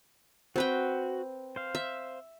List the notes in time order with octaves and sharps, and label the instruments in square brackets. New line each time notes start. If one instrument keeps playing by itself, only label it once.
[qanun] C4 B4 G5 [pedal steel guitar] F#4
[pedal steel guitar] C5 F5
[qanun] E5